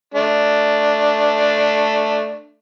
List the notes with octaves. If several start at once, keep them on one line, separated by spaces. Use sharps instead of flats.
A3 D4